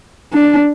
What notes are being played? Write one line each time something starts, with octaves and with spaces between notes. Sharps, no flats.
D4